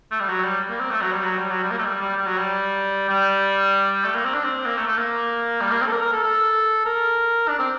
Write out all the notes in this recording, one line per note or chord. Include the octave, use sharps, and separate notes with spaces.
A3
G3
F#3
G3
A#3
C4
A3
F#3
G3
F#3
G3
F#3
G3
A#3
A3
G3
G3
G3
F#3
G3
G3
A3
A#3
C4
D4
C4
A#3
A3
A3
A#3
G3
A#3
C4
A4
A#4
A#4
A4
A4
A#4
D4
C4